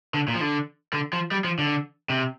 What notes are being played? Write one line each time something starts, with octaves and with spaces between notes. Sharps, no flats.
D3
A#2
F3
D3
D3
F3
G3
F3
D3
C3